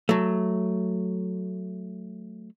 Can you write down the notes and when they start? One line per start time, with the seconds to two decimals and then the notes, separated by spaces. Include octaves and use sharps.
0.09 F#3 A3